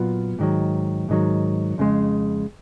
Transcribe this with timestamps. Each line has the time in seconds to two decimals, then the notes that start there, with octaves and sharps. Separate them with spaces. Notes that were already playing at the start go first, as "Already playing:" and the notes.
Already playing: A#2 F#3 B3 F4
0.39 G#2 D#3 F#3
1.09 G#2 D#3 F#3
1.78 F2 C#3 G#3